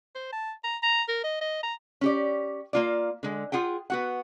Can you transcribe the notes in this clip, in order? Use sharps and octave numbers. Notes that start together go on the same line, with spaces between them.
C5
A5
A#5
A#5
A#4
D#5
D#5
A#5
C#4 G4 D5
A#3 F4 D5
D3 G#3
F4 G#4 F#5 G5
B3 F#4 F#5